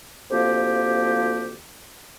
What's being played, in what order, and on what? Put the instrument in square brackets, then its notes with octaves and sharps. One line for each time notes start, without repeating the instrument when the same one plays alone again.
[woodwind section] D2 C3 F3 A#3 G4